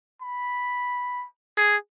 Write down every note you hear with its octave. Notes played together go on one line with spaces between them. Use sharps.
B5
G#4